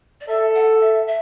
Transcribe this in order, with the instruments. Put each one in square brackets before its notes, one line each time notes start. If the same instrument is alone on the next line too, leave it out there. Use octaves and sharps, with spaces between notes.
[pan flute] D5
[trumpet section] A4 [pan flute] E5
[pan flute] F#5
E5
E5